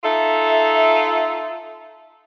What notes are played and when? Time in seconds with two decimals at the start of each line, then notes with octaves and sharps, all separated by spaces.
0.04 D#4 F4 A4 E5